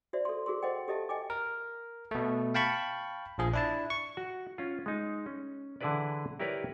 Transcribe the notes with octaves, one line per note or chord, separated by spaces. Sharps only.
F#4 C5 D5 E5
A4 C6
F#4 G#4 A#4 C6
C5 D#5 F#5 G5
G4 A4 D#5 E5 A5
D#5 G5 G#5 D6
A#4
B2 A3
F5 G5 A5 B5 C#6
A#1 F3 G#4
D4 E4 A5
C#6
F#4
C#4 F4
G#3 D#4
C#4
D3 E3 E4 G#4 B4 D5
E4 G4 A#4 B4 C#5 D5